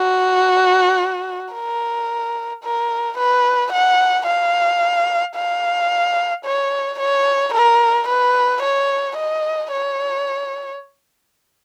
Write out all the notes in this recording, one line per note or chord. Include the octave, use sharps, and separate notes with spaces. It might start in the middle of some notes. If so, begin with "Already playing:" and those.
Already playing: F#4
A#4
A#4
B4
F#5
F5
F5
C#5
C#5
A#4
B4
C#5
D#5
C#5